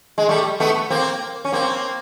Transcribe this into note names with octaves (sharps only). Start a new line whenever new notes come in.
G#3
G3 A3
A3 B3
A#3 C4
C#4
A#3 C4